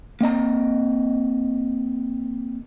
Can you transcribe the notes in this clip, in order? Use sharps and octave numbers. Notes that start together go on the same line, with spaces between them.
A#3 C4 D#5 A#5